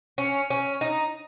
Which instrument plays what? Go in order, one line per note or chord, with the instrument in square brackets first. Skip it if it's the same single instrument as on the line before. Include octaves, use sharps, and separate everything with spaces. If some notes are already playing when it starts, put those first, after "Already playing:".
[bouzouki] C#4
C#4
D#4